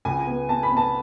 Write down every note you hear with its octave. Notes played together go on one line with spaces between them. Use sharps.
C#2 G#5
B3
B3 A5
B5
B3
A5